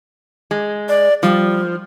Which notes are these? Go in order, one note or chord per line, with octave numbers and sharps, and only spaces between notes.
G#3
D5
F3 G3